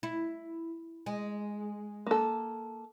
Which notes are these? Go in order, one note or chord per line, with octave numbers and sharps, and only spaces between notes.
E4
G#3
A#3 A4